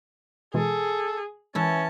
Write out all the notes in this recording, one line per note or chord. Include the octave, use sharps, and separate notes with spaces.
B2 E3 G#3 G#4 A4
E3 G#3 C#4 E4 A5